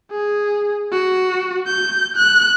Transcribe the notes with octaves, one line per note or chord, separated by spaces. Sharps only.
G#4
F#4
G6
F#6